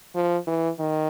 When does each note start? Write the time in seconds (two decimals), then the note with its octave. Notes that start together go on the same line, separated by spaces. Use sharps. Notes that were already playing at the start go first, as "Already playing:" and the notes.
0.15 F3
0.47 E3
0.79 D#3